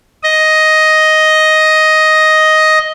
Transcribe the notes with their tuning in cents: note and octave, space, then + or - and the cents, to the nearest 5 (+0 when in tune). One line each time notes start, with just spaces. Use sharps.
D#5 +5